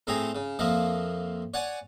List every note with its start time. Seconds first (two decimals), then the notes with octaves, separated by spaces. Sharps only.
0.07 A2 A3 C4 G#4 A#5
0.35 C#3
0.59 F2 F3 A#3 D#5 E5
1.54 C#5 D5 F#5 G#5